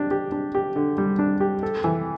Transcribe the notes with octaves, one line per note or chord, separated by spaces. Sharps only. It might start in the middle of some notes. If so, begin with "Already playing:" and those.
Already playing: D4 G4
G4
D4
G4
D3
G3
D4
G4
A4
E3